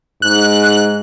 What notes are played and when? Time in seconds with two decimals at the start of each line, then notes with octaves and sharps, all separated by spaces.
0.22 G#2 F#6